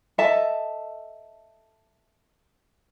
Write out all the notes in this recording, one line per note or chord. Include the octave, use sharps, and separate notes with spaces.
A4 D#5 E5 A5